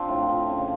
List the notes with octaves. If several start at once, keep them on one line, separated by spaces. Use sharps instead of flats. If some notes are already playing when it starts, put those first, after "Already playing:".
Already playing: F3 C4 D4
A2 F4
F3
C#3